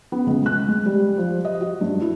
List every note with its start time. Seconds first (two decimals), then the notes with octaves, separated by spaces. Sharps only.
0.12 B3
0.27 C#2
0.46 F#6
0.68 G#3
0.86 G3
1.18 F3
1.45 D#5
1.61 F#4
1.81 G2
2.01 E4